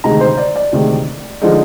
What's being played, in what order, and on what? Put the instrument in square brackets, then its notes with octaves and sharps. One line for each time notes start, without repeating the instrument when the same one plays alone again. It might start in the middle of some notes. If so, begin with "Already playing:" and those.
[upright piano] D2 C3 D#3 G#3 D#4 A#5
C5
D5
D5
D2 C3 D#3 G#3 D#4
D3 F3 G#3 D#4